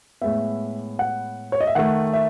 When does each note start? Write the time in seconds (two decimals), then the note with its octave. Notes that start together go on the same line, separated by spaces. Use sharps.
0.22 A2 G#3 B3 E5
0.99 F#5
1.52 C#5
1.61 D#5
1.67 E5
1.75 D#3 A3 F#5
2.13 E5